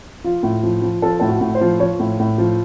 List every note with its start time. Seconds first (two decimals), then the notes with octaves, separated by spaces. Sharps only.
0.24 F3 F4
0.43 A2
0.63 F3
0.82 F3
1.02 F3 A4
1.20 A2 A4
1.29 F#4
1.41 A2
1.55 C5
1.61 F3
1.80 F3 C#5
2.00 A2
2.20 A2
2.38 F3